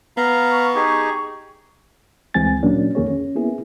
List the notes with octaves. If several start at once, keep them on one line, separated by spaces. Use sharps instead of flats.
B3 F5 A#5
C#6
D#4 G4 G#4
D2 E3 G#3 C4 G#5 A6
A#2 F#3 A#3 C#4 D4
F2 D#3 A#3 G#4 C#5
C#4
A#3 B3 E4 G#4